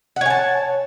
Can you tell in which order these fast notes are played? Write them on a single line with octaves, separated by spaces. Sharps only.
F#5 C#5 G#5 A5